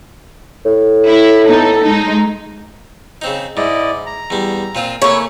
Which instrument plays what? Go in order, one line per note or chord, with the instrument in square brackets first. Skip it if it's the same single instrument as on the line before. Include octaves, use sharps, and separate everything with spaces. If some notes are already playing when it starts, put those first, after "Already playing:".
[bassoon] A2
[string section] E4
B3 D#4 A4
G#3 D#4
[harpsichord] C#3 C4 D#4
[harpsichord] G#2 [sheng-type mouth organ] E4 D5 D#5
[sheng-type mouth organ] A#5
[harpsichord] E2 G3
A#2 C4 F4
[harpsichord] C#3 A3 C#4 [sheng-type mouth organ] A#3 [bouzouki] E4 C#5